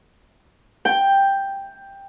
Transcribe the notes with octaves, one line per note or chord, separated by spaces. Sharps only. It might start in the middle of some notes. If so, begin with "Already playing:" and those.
G5